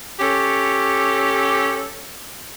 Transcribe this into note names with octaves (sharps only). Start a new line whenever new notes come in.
C#4 G4 A4